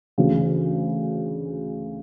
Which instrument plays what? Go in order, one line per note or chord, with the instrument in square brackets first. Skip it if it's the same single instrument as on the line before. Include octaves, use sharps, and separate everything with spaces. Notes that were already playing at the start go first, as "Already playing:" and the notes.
[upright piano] D2 C#3 E3